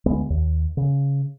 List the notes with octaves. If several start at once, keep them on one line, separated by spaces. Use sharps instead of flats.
D2 G#3 B3
D#2
C#3